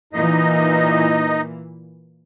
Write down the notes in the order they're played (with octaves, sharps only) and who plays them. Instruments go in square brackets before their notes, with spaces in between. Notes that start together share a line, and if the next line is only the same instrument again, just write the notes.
[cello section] A#2 E3 A#3 [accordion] D#4 D#5